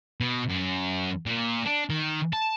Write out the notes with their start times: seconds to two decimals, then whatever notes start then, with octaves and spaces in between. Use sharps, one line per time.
0.21 B2
0.49 F#2
1.26 A#2
1.66 D4
1.90 D#3
2.33 A5